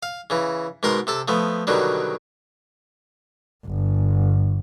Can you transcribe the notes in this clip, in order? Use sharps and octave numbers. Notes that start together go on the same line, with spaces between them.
F5
C#3 E3
G#2 B2 A#4 C6
C3 A4 A5
F3 A3 B3
B2 D3 D#3 F#3 G3
G1